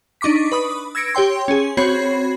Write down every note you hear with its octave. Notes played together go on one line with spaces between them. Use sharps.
D4 D#4 C#6 D6 B6
B4 B5 D#6
E6 G#6 A#6 C#7 D7
G4 C#5 G5 C6
C#4 G#4
C4 F#4 C#5 B5 G#6 C7